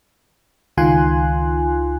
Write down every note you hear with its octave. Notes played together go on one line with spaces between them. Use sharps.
C#2 D#3 F4 G#5 C6 F#6